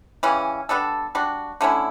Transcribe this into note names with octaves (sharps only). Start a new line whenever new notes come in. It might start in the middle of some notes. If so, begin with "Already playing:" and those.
C#3 E3 G3 C#4
G3 B3 D4 A4
G3 D4 F#4
D3 A3 C#4 E4